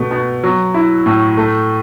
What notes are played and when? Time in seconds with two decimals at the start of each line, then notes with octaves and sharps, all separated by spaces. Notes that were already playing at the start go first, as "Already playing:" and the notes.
Already playing: B2 A3
0.11 B2
0.44 F#3
0.74 E4
1.06 A2
1.37 A3